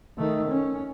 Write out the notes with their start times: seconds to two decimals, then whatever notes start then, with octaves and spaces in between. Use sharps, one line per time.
0.18 D#3 A3
0.48 C#4